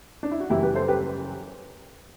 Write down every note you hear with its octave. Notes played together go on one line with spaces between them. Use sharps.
D4
E4
F#4
F#1 F#2 E3 G3 E4 G4
G4 B4
A4 C5
G4 B4